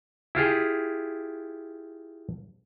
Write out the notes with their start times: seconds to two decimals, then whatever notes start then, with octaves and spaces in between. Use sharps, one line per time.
0.35 E4 F4 G4 G#4